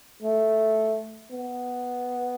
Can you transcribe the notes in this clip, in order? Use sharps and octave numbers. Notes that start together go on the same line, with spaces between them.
A3
B3